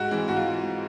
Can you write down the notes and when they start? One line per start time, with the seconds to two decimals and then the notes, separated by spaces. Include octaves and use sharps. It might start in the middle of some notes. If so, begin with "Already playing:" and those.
Already playing: G#2 F#4
0.11 E3 G#3 C4
0.28 G#2 F#4
0.36 F4